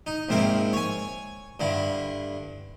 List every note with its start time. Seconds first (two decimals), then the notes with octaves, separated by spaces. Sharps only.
0.07 D#4
0.29 A#1 G#2 C4 E4 A#4
0.73 C#5 G#5
1.60 G2 D3 E4